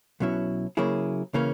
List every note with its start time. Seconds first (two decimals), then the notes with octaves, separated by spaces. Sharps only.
0.20 B1 B2 F#3 C#4 E4
0.77 C#3 F#3 A#3 E4 G#4
1.34 C#3 E3 A#3 C#4